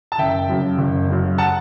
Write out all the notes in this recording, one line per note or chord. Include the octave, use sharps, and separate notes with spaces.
A5
F#1 E5 G5
F#2 C#3
F#1
F#2 C#3
F#5 A5